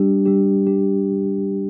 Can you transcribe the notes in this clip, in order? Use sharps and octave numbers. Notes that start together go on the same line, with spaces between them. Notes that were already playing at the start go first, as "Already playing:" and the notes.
Already playing: G3 D4 G4
G3 D4 G4
G3 D4 G4